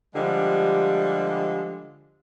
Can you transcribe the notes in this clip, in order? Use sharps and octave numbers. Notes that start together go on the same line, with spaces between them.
D3 F3 G3 G#3 G4